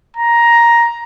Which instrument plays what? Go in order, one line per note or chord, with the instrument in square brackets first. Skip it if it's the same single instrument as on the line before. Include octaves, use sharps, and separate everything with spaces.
[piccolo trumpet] A#5